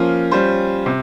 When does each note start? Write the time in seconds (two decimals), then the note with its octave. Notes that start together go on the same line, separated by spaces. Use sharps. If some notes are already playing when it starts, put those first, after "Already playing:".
Already playing: F3 A#3 C#4 F4
0.31 G3 C#4 F4 C5
0.86 C3